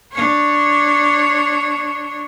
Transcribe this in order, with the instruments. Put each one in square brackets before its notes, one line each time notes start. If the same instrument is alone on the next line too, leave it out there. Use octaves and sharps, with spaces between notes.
[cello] D4 C#5